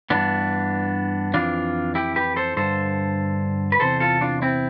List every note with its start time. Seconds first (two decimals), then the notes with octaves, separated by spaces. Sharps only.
0.10 G2 E3 B3 D4
1.34 F2 E3 D4 F4
1.95 E4 G4
2.16 G4 B4
2.36 A4 C5
2.57 G2 D3 A4 C5
3.72 B4
3.80 E2 C3 E3 A4 C5
4.00 F4 A4
4.21 D4 F4
4.42 C4 E4